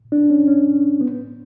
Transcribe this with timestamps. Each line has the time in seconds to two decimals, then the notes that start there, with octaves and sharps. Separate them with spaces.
0.12 D4
0.30 C#4
0.48 C#4
1.01 B3